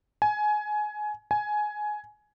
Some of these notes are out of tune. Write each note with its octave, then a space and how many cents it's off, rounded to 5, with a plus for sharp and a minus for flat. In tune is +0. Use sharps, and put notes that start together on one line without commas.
G#5 +20
G#5 +15